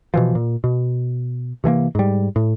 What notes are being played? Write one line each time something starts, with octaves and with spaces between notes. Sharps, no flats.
B2 E3 F3
A#2
B2
C3 E3 A3 A#3
G#2 G3
A2